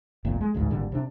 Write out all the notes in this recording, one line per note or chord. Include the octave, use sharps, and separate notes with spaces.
G1 C2 F2 A#2
G#3
A1 D2 G#2
G#1 A#2 D3 G3
C3 D4